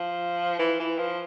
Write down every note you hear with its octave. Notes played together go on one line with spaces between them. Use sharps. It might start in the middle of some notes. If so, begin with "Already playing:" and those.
Already playing: F3
E3
E3
F3